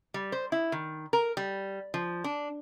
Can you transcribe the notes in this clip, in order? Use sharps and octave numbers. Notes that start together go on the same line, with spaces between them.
G3
C5
E4
D#3
A#4
G3
F3
D4